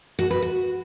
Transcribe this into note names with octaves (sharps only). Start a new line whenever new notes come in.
F#4
B4
F#4